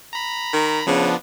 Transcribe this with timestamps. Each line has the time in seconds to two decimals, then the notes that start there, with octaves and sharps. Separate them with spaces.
0.13 A#5 B5
0.53 D#3
0.87 C#3 F3 B3 D4